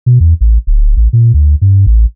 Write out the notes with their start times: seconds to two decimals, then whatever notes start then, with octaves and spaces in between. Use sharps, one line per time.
0.06 B2
0.20 E2
0.41 A1
0.67 D1
0.97 A1
1.13 A#2
1.34 D2
1.62 G2
1.87 A1